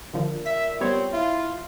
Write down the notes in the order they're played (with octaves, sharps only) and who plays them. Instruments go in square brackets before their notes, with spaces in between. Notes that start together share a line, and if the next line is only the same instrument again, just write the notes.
[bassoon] A#2 [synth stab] D3 F3
[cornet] E5 [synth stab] B6
[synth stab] G3 B3 C#5 [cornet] C4
[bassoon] E4 [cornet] F4